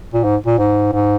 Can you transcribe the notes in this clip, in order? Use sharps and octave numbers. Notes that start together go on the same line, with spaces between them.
A#2
G#2
A#2
G#2
G#2